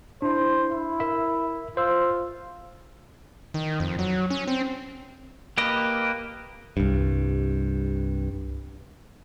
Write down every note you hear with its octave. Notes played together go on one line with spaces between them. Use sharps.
D4 E4 C5
E4
A#4 E5
F4 C5 E6
D#3
F2
F#3
C#4
C4
A#3 G4 B4 D#5
C2 G2